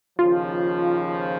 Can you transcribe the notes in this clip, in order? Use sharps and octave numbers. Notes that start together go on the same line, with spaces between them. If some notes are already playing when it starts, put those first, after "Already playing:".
D#2 C#3 F3 F4